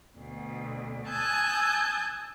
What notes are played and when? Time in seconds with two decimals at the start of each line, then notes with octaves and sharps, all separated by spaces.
0.18 D2 B2
1.08 G#5 A5 D#6 E6 F#6 G6